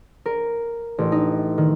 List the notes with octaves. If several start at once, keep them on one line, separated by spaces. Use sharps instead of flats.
A#4
A1
D#4
D#3